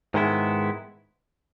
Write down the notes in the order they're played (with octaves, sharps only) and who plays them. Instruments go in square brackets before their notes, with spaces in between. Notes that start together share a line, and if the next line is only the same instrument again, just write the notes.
[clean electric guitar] G#2 D#3 G#3 B3 E4